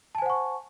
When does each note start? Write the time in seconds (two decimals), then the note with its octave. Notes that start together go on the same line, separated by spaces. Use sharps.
0.15 A5
0.18 G#5
0.22 C5
0.26 F#5
0.30 C#6